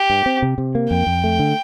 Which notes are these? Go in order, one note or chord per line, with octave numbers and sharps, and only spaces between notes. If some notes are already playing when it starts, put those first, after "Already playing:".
Already playing: G4
G2
C4
C3
C3
A#3
F2 G5
F2
A3
D3